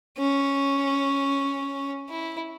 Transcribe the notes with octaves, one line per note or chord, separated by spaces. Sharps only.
C#4
E4